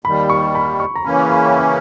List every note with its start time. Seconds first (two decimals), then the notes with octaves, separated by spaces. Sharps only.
0.05 D#2 D#3 G3 B5
0.30 C#6
0.55 B5
0.80 C#6
0.95 A#5
1.04 C#3 E3 A#3 C#4 B5
1.30 B5
1.45 G5
1.55 G#5